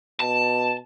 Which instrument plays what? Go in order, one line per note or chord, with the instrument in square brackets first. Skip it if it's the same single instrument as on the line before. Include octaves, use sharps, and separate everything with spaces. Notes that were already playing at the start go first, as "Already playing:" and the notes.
[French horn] B2 [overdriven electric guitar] A5